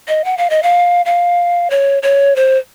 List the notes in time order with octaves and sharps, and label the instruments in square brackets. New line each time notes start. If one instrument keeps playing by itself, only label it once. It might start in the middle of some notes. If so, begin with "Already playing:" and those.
[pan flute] D#5
F#5
F5
D#5
F5
F5
C#5
C#5
C5